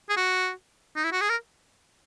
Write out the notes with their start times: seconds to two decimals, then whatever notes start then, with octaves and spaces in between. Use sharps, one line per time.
0.09 G#4
0.17 F#4
0.96 D#4
1.04 E4
1.12 F#4
1.21 G#4
1.29 A#4